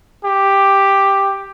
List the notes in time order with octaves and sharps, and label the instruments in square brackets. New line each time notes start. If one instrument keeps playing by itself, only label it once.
[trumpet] G4